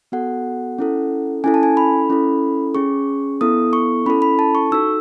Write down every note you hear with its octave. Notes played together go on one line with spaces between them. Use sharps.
B3 F#4 A4 F#5
C#4 E4 A4
C#4 E4 A4 G#5
A5
G#5
B5
C#4 E4 A4
C#4 G#4 C#6
B3 E4 A4 D#6
C#6
C#4 E4 A4 B5
B5
A5
C#6
D#4 F#4 A4 E6